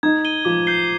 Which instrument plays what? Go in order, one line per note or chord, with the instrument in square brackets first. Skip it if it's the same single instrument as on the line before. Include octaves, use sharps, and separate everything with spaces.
[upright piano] D#4 [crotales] G#6
[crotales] D#7 G7
[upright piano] F3 [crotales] D6
[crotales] G6 C7 G7